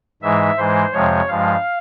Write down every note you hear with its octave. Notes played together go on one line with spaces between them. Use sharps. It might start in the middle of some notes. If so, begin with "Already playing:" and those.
G#2 E3 G#3 E5
G#2 E3 G#3 C5
F2 C3 F3 G#3 C#5
G2 F3 G#3 F5